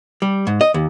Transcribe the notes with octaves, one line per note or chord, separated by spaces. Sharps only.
G3
G#2
D#5
D#2